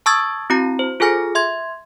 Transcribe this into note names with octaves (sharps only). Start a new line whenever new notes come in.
A5 C#6 D#6 E6 G#6 A6
C4 E4 F#4 A#5
C5
F4 G#4 A4 G#5 F6 A#6
E5 C6 G#6